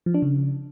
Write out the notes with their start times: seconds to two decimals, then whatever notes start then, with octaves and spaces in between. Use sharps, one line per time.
0.06 F3
0.14 D4
0.22 C#3